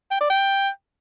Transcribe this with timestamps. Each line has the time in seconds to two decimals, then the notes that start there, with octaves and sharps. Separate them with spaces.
0.11 G5
0.21 D5
0.30 G5